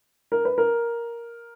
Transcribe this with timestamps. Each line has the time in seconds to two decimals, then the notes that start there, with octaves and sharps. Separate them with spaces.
0.32 A#4
0.45 B4
0.58 A#4